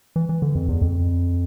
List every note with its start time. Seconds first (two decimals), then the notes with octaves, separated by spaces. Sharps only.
0.16 E3
0.29 E3
0.42 D3
0.55 F2
0.69 E2
0.81 F2